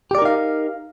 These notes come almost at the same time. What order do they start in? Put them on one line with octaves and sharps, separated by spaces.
G4 D5 A#4 D#4 F5